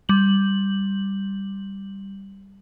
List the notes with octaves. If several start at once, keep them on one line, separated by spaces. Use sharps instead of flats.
G3 F#7